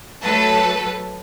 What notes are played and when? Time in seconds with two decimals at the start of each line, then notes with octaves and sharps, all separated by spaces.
0.23 F#3 A3 A4 B4 A5